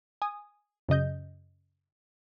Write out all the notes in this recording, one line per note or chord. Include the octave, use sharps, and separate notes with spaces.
G#5 D#6
F#2 C#3 D#5 G6